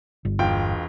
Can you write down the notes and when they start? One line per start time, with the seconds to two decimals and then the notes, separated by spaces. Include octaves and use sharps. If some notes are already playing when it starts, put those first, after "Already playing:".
0.25 G1
0.39 E1 F4 G5